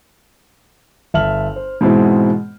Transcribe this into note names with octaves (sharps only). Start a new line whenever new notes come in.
G1 E5 A5 F6 F#7
C5
G#2 B2 E3 G#3 C4 E4